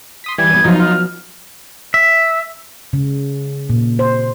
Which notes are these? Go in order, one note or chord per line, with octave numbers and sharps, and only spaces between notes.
C6 D#6 B6
E3 G3 G#6
B3 D#7
F3 F#3 D#4 F4
F6
E5
C#3
A#2
C5